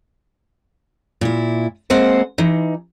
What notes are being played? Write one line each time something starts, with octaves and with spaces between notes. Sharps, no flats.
A#2 E4
G#3 A#3 C4 C5 F#5 G#5
E3 D#4